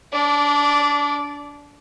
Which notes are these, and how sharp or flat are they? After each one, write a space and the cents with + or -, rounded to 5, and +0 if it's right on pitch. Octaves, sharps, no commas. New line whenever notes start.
D4 -25 D5 -10